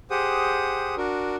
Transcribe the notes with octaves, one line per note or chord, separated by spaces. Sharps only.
G4 G#4 C5 F#5 D#6
D4 F#4 A#4